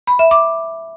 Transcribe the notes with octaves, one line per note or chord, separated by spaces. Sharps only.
B5
E5
D6